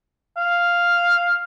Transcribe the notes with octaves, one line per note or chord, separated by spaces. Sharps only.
F5